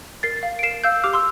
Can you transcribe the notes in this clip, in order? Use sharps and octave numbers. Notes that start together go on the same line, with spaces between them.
A#4 A6 C7
F5
D7
A#4 C7 E7
F5 E6 G6
G4 D6 F6
C6 E6